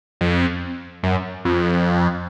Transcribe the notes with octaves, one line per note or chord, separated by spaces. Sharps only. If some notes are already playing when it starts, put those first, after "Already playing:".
F2
F#2
F2